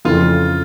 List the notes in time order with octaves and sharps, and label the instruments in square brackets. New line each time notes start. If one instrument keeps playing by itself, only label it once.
[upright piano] F2 C#3 E3 A3 C#4 [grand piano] F4